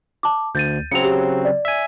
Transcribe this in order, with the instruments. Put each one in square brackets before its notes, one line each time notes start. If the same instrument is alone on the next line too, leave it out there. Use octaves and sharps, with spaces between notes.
[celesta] A5 D6
[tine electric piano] D2 [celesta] G6 A6 D#7
[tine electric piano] C#3 F#3 C4 [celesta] C#7 F7
[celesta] G4
D5
[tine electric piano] E5 G#5